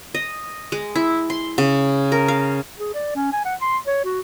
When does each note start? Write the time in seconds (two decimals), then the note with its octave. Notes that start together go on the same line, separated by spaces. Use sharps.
0.14 D#5
0.72 G#3
0.95 E4
1.30 C6
1.58 C#3
2.12 A#4
2.28 F5
2.79 G#4
2.94 D5
3.15 C#4
3.33 G#5
3.45 F#5
3.61 C6
3.87 C#5
4.05 F#4